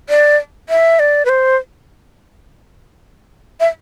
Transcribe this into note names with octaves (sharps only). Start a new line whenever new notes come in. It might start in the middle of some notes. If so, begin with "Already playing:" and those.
D5
E5
D5
B4
C5
E5